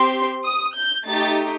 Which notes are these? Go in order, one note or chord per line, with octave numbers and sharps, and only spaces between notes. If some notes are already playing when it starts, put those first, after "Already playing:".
Already playing: C4 G4 C6
D#6
G6
A3 D#4 G4 A6